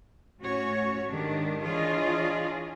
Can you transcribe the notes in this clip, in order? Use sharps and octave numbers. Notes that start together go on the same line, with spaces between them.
A2 C#4 F#4 C#5
G#2 D3 D#3 D4 G4
E3 D4 F4 G#4 C#5 D#5